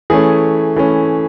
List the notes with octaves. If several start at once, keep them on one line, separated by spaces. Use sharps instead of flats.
E3 A3 C#4 G#4
E3 A3 C#4